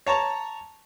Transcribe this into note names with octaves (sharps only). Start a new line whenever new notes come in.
C#5 A5 A#5 C#6